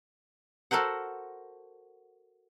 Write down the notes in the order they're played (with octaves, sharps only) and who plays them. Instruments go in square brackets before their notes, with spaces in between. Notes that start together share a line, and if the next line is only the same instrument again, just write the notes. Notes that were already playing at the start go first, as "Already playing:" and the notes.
[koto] F#4 A4 A#4 C5 F#5